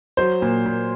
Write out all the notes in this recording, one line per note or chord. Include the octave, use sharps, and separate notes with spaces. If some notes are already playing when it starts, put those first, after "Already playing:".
F#3 C5
A#2
A#2